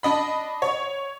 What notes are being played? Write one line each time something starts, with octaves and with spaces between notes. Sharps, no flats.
D4 D#5 B5
C#5